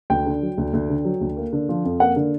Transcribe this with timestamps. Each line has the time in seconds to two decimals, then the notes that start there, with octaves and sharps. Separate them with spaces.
0.10 D2 G5
0.26 D3
0.42 F#3
0.58 D2
0.73 D2
0.89 D3
1.05 F#3
1.21 D2
1.37 A#3
1.53 D3
1.69 F3
1.84 F2
2.00 A#3 F#5
2.16 D3